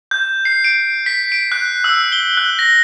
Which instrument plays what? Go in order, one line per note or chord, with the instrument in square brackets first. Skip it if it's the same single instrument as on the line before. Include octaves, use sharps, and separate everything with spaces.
[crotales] G6
C7
D7
B6
D7
F#6
E6
G7
F#6
A#6